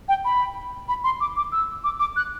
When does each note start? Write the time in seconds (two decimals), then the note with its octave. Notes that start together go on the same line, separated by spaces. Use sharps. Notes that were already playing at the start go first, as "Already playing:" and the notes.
0.08 G5
0.25 B5
0.88 B5
1.04 C6
1.20 D6
1.36 D6
1.52 E6
1.84 D6
2.00 D6
2.16 F#6